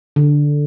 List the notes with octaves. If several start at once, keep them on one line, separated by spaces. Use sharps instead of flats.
D3